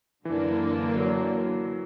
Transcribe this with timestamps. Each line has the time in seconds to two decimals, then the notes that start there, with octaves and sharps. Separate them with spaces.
0.25 F#2 D3 E3 A#3 D4
0.96 F#3